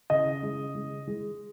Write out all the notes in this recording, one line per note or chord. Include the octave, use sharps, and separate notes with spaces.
C#3 D#5
G#3
G#3
G#3